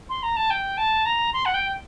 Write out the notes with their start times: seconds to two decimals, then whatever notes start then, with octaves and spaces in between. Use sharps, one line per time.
0.09 C6
0.23 A#5
0.37 A5
0.50 G5
0.78 A5
1.06 A#5
1.33 C6
1.46 F#5
1.54 G5